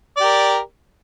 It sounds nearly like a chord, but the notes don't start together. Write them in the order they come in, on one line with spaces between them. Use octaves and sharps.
D5 G4 A#4